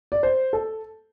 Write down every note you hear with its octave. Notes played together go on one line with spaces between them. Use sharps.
D5
C5
A4